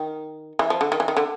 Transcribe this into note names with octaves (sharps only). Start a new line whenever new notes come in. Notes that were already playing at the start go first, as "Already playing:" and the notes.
Already playing: D#3
E3
F3
D3
D#3
E3
D#3
D3